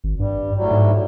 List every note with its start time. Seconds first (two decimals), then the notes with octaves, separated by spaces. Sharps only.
0.04 G#1
0.19 G2 G3
0.56 A2 F#3 G3
0.71 G#2